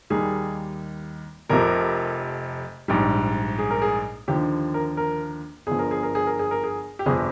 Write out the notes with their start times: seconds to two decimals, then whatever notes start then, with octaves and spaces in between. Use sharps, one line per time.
0.10 D#2 D#3 G3 G#4
1.50 F1 F2 C3 F3 A#4
2.88 A#1 G#2 G3
3.58 G#4
3.71 A#4
3.82 G#4
4.28 D#2 D3 F3 G4
4.74 A#4
4.97 A#4
5.67 G1 G2 F3 G#4
5.79 A#4
5.91 G#4
6.03 A#4
6.15 G#4
6.27 A#4
6.39 G#4
6.51 A#4
6.64 G#4
6.99 G4
7.06 G1 F2 C3 F3 G#4